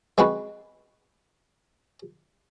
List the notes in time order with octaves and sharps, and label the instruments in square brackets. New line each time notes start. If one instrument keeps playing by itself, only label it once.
[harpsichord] G#3 C4 F#4 B4